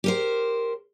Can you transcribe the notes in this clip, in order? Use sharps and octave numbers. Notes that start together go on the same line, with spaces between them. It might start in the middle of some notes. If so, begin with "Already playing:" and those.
G4 A#4 C5